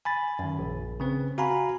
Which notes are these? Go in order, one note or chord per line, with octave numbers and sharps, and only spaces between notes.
G#5 B5 A6
F#2 D#3
A#1
C#3 C4 B4
F#4 F5 G#5 A#5 B5